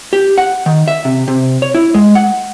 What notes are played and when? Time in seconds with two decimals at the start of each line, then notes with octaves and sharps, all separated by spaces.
0.13 G4
0.38 F#5
0.66 D#3
0.88 E5
1.05 C3
1.28 C3
1.62 C#5
1.74 E4
1.94 G#3
2.15 F#5